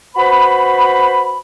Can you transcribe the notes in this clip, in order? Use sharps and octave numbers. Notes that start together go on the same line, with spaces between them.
F#4 B4 C5 B5